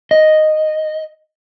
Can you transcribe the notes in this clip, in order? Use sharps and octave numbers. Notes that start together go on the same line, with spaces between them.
D#5